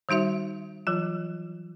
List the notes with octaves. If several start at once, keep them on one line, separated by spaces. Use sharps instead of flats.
D#3 G3 D#4 F#4 E5
E3 F#3 F4